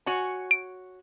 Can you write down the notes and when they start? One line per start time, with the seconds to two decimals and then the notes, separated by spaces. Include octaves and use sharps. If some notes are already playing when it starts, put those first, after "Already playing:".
0.06 F#4 C#5 G#5
0.51 D7